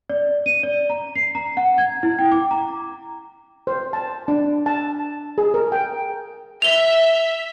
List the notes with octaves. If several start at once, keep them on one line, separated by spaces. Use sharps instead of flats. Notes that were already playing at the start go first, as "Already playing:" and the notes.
D5
D#7
D5
A#5
C7
A#5
F#5
G#6
E4
G5
D6
A#5
C5
A5
D4
A5
G#4
A#4
G5
E5 F7 G7